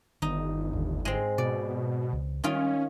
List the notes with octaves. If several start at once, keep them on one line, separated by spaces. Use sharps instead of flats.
G1 D#3 B3 D#4
A1 D#2 D3
G#2 G#3 C4
B2 D5
C#2
D#3 G3 C#4 F4